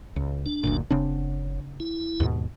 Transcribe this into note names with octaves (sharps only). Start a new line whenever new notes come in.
C#2
D4
F#1 D2 A#2
F#1 C#3 C4 D4
E4
D#2 G#2 B2